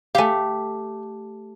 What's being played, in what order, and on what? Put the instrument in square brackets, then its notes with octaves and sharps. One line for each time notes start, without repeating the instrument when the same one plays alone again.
[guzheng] A3 G4 [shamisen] F5 G#5